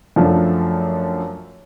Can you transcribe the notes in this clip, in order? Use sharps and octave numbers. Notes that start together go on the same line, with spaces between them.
F#2 F3 A3 D4